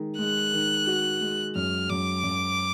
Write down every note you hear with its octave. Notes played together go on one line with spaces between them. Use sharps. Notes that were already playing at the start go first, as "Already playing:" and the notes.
Already playing: D#3 G#3
G#3 F#6
D#3
F#4
G#3
F#2 F6
F#2 D6
F#2